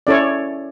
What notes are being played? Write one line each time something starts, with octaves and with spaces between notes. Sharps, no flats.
C#4 E4 A4 C#5 D5